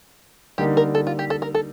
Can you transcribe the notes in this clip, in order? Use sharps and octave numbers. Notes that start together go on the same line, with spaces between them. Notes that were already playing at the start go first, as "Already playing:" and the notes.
D3 G3 A#3 D#4 G4
A#4
A4
F4
G4
A4
A#4
A4